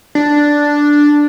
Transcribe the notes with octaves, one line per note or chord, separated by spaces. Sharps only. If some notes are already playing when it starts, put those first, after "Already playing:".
D4